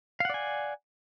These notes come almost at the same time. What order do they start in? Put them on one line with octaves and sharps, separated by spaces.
F5 F#5 D5 G#5